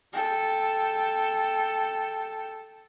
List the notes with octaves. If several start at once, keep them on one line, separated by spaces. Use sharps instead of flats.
A4 G5